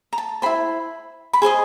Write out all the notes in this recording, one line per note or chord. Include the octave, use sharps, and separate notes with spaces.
A#5
A5
E4 G4 C5 B5
B5
G#4 C5 D#5 C6